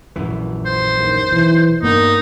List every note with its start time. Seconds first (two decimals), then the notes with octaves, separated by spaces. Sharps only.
0.16 A#1 F#2 E3
0.66 C5
0.99 D#2
1.31 B1 E3
1.82 G2 A#3 B3 D4 D#4